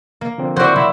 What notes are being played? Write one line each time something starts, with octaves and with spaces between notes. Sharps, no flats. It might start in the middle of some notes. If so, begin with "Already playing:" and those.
A#3
D3 F3 C4
F#3 E4 F#4 C5 D5
F#3 E4